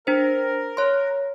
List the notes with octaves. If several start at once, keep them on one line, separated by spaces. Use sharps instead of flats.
D4 A#4 C5
C#5 C6